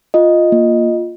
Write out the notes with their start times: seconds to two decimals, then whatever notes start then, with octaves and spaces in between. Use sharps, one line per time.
0.14 F4 D#5
0.52 A#3